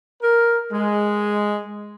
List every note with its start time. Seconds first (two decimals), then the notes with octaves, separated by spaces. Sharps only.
0.22 A#4
0.71 G#3